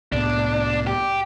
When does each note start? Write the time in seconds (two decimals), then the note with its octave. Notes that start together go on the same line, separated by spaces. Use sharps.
0.12 C2 A2 B3 D4
0.87 G4